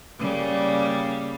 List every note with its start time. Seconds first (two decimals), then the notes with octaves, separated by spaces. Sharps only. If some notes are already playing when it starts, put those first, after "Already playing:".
0.19 C#3 G3 A#3